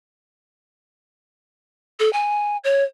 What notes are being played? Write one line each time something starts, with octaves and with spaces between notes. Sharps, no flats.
A4
G#5
C#5